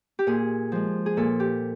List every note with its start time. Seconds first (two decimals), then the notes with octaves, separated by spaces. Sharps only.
0.19 G4
0.27 A#2 G#4
0.72 F3 G#3
1.06 G#4
1.17 A#2 A4
1.40 G4